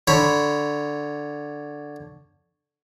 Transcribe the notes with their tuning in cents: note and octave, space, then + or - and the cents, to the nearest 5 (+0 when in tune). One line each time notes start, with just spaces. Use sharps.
D3 +0 C#5 +0 B5 -15